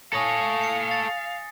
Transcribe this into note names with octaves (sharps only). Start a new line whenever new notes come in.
A4 C#5 F5 G#5 D#6 A#6
C7 C#7
A6